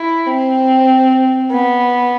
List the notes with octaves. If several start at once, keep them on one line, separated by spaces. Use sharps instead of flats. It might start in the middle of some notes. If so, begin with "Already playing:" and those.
Already playing: E4
C4
B3